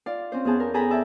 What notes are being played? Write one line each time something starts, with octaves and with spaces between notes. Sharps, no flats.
F4 D5 F5
C4 C#4 C5
E2 B3 G#4 A5 G6
A#4
G#4 A4 G5 G#5 A#5 B5
D5 E5 G5 A5 B5